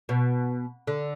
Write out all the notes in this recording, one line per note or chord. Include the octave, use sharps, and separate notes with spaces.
B2
D3